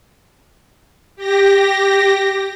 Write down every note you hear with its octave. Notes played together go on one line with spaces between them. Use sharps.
G4 A#6